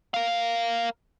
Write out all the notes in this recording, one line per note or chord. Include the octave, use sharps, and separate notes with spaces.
A#4 F5